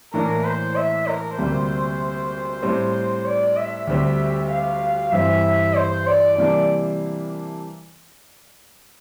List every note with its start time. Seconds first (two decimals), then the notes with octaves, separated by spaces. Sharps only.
0.13 A2 E3 A#3 D4 A#4
0.44 C5
0.75 E5
1.07 A#4
1.38 D2 C3 G3 A#3 C5
2.63 A2 G3 C4
3.26 D5
3.57 E5
3.87 D2 D3 G3 C4 G4
4.50 F5
5.12 G2 E3 G3 C4 E4 E5
5.75 C5
6.06 D5
6.37 C3 E3 G3 A#3 D4 D5